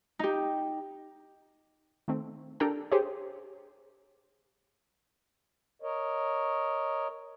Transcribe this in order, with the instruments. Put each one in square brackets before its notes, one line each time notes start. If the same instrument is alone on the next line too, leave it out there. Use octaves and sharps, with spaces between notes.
[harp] D#4 G4
[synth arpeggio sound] D#3 A3 C4
D4 G4 A4 A#4 G5 A#5
G4 G#4 C5 C#5
[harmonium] A#4 C#5 D#5